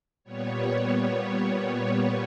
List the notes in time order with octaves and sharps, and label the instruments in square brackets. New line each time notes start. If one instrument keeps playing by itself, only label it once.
[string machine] A#2 G3 B3 C#5